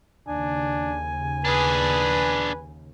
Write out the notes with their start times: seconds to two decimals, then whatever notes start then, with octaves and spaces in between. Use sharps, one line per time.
0.28 D#2 C#3 D4 G#5
1.45 D4 G#4 B4